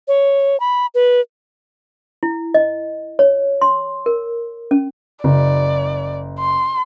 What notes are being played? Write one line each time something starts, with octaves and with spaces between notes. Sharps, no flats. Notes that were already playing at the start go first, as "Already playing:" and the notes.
C#5
B5
B4
E4
D#5
C#5
C6
A#4
C#4
F#1 D5
C6